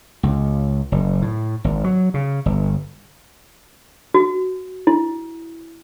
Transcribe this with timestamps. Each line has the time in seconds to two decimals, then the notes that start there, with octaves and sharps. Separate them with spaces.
0.23 C#2
0.92 F#1
1.22 A2
1.64 G#1
1.84 F#3
2.14 C#3
2.46 G1
4.14 F#4
4.87 E4